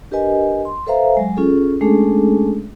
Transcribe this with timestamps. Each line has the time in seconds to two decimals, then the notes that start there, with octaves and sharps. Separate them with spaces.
0.11 D4 G4 A#4 B4 D#5 G#5
0.65 C6
0.87 A4 B4 C5 E5 F5 A#5
1.15 F#3 G#3 G#5
1.37 C#4 F4 G#4 A4
1.81 G#3 A3 C#4 D4 G#4 A4